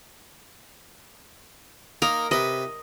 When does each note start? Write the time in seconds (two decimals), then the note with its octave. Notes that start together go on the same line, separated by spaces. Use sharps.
2.02 A#3 D#4 A#4
2.31 C3 B4 D#5